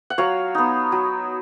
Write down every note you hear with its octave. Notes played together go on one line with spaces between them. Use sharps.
F#5
F#3 C#5 F5
B3 D#4
F#3